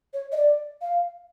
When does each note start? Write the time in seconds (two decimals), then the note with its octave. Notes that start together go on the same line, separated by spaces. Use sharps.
0.14 C#5
0.32 D#5
0.36 D5
0.82 F5